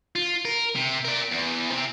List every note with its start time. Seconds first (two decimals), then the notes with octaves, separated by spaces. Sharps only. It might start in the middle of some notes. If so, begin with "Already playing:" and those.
0.15 F4
0.45 A#4
0.75 C3
1.05 A#4 D5
1.31 E2
1.71 C3 C4